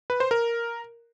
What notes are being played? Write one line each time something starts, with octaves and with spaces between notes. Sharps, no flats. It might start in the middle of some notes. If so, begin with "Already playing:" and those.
B4
C5
A#4